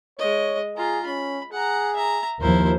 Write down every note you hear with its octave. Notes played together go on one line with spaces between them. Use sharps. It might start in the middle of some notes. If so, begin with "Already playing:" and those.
G#3 C#5 D#5
F4 G#4 A#5
C#4 B5
G#4 F#5 A#5
E5 A#5
D#2 F3 E4 A#4 C5